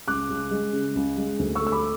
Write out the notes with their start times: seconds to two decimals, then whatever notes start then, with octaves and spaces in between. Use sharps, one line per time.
0.08 C#2 D6 F#6
0.30 C#2
0.51 G#3
0.73 C#3
0.95 C#2
1.17 G#3
1.39 D2
1.55 C#6 E6
1.61 A3
1.67 E6
1.72 B5 D6